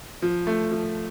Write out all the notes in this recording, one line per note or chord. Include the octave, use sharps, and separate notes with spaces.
F3
A3
F3